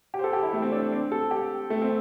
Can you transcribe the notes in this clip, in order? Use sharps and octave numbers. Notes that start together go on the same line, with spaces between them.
G4
C5
A4
G4
E4
A3
C4
D4
C4
A4
G4
A3
C4